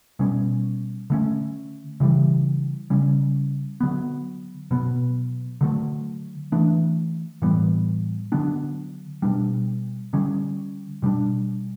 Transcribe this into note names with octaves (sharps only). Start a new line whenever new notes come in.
B2 G3 C#4
D3 A3 C#4
C#3 E3 G3
C#3 G3 C#4
D3 F#3 B3
B2 F#3 B3
D3 F#3 A3
E3 A3 D4
A2 E3 G3 B3
D3 F#3 B3 D4
B2 G3 D4
D3 G3 C#4
B2 G3 D4